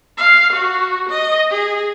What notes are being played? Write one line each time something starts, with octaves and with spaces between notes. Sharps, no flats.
F5
F#4
D#5
G#4